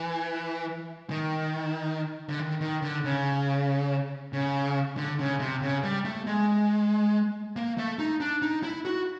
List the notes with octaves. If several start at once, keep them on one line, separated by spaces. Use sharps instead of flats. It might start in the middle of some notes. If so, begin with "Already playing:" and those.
Already playing: E3
D#3
D3
D#3
D#3
D3
C#3
C#3
D3
C#3
C3
C#3
G3
A3
G#3
A#3
A3
D#4
D4
D#4
E4
F#4